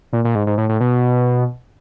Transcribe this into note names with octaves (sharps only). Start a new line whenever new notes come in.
A#2
A#2
G#2
G#2
A2
A2
B2